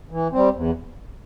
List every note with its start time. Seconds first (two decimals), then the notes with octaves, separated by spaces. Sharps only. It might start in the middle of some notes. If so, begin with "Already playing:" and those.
0.10 E3
0.32 G3 C4
0.54 E2